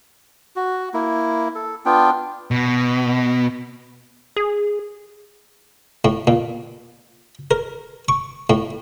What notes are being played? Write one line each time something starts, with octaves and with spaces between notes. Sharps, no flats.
F#4
A#3 E4
A4
B3 D4 F4 G5
B2
G#4
A2
A#2
A#4
C#6
A2